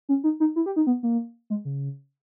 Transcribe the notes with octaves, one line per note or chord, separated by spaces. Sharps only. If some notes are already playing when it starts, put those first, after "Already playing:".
C#4
D#4
D#4
E4
G4
D#4
B3
A#3
G#3
C#3